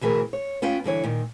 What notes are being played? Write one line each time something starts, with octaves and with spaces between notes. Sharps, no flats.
D2 B2 E3 G#4 A#4
C#5
B3 C#4 F4 G5
G2 D3 E3 C#5
A#2 D#3